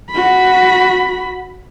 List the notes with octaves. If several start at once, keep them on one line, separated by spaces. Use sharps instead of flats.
F#4 B5